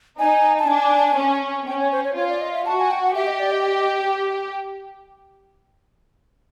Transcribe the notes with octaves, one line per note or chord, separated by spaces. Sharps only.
D#4 G#5
A5
D4 G#5
C#4
C#4 G5
C#5
C5
C#5
F4 C#5
D5
D#5
E5
F#4 A5
G#5
G5
F#5
G4 E5
D#5
D5
D#5